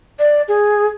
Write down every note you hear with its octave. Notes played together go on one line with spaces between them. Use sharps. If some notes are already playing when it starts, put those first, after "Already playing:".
D5
G#4